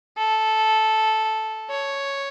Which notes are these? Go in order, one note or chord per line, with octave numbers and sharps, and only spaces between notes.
A4
C#5